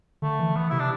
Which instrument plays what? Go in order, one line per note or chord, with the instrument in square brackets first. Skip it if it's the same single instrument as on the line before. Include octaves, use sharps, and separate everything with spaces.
[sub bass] D3 [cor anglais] A3
[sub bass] E3
[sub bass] E3 [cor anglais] B3
[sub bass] C3 [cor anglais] E4
[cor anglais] D4